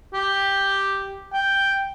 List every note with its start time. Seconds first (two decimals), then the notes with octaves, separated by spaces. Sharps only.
0.14 G4
1.33 G5